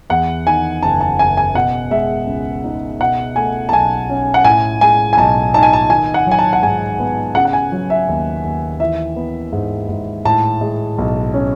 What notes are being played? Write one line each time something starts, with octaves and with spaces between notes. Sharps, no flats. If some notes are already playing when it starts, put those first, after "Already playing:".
E2 F#5
D#3 G#5
F#1 A5
A5
F#1 G#5
G#5
B2 F#5
G#3 E5
C#2
D#4
B2 F#5
A3 G#5
A5
B1 G#5
C#4
F#5
A2 G#5
G#3 G#5
G#5
B1 A5
D#4 A5
G#5
A5
D#3 G#5
F#5
F#3 G#5
A5
F#5
G#2 G#5
B3
C#3 F#5
F#5
G#5
F#3
E5
D#2
D#2
E3 E5
B3
G#2
G#2
A2 A5
G#3
B1
C#4